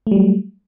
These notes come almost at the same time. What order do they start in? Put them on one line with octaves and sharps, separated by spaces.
A3 G3 F#3